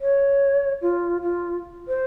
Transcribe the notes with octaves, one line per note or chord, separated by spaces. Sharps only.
C#5
F4
F4
C5